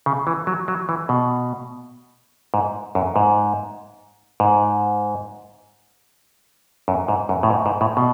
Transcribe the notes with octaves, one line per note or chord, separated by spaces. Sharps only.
C#3
E3
F#3
F#3
E3
B2
G#2
F#2
G#2
G#2
F#2
G#2
F#2
A2
G#2
G#2
A2
B2